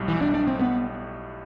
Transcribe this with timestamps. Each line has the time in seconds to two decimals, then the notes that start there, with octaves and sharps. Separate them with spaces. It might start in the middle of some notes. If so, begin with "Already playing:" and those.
Already playing: B1 A2 G3
0.08 E3
0.21 D4
0.35 D4
0.48 C4
0.61 B3